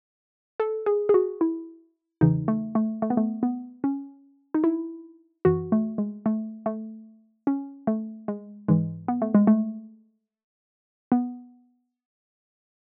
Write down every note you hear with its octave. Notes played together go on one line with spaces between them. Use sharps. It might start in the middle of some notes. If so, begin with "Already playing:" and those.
A4
G#4
G#4
F#4
E4
E2 C#3 E3 D#4
A3
A3
A3
B3
A3
B3
C#4
D#4
E4
F#2 E3 F#4
A3
G#3
A3
A3
C#4
A3
G#3
G#2 E3 G#3
B3
A3
G#3
A3
B3